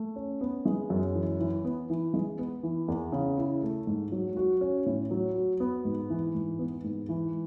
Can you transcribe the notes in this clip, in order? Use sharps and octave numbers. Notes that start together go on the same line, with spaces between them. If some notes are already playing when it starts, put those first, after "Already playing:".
Already playing: A3
C#4
B3
G#3
F#2
E3
E3
B3
E3
G#3
B3
E3
E2
C#3
E4
A3
G#2
F#3
F#4
C#4
A2
F#3
F#4
B3
G#2
E3
G#2
B3
G#2
E3